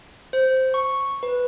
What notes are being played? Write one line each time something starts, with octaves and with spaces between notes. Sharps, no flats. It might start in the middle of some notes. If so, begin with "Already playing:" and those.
C5
C#6
B4